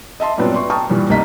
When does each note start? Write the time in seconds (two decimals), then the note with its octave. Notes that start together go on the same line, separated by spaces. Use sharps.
0.20 D#5 E5 A5 C6
0.38 G2 A#2 F#3 B3 C4 D4
0.55 C6 C#6
0.70 G5 A5 A#5 C#6 D#6 F6
0.90 G2 A#2 E3 G3
1.10 C2 A#3 D#4 D#5 B6